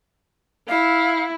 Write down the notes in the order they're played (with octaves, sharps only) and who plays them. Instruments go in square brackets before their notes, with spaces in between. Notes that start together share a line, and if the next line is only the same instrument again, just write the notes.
[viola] E4 [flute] F5